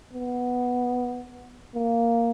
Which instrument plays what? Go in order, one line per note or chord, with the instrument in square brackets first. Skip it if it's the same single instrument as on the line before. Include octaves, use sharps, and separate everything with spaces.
[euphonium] B3
A#3